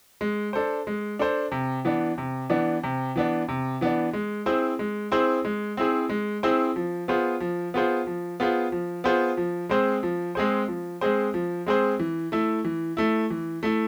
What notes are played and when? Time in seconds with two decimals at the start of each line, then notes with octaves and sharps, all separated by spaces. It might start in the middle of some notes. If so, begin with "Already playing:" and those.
0.21 G#3
0.53 D4 A4 C5
0.87 G#3
1.19 D4 A4 C5
1.52 C3
1.85 E3 B3 D4
2.18 C3
2.50 E3 B3 D4
2.83 C3
3.16 E3 B3 D4
3.48 C3
3.81 E3 B3 D4
4.13 G#3
4.46 C4 E4 G#4 C5
4.79 G#3
5.11 C4 E4 G#4 C5
5.45 G#3
5.77 C4 E4 G#4 C5
6.09 G#3
6.43 C4 E4 G#4 C5
6.76 F3
7.08 B3 F4 G#4 C5
7.40 F3
7.74 B3 F4 G#4 C5
8.07 F3
8.40 B3 F4 G#4 C5
8.72 F3
9.04 B3 F4 G#4 C5
9.37 F3
9.69 G#3 C4 G#4 C5
10.03 F3
10.35 G#3 C4 G#4 C5
10.68 F3
11.01 G#3 C4 G#4 C5
11.34 F3
11.67 G#3 C4 G#4 C5
11.99 E3
12.32 A3 E4
12.64 E3
12.97 A3 E4
13.30 E3
13.63 A3 E4